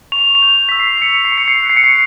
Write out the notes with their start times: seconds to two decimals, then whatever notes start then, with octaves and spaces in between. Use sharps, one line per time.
0.12 C#6 F7
0.35 F7
0.42 G6
0.69 E6 B6
0.79 C7
0.98 C7
1.02 C#6 C#7
1.25 C7
1.32 C#6
1.38 C#7
1.48 C7
1.63 F#6
1.70 C7
1.77 C#7
1.84 C7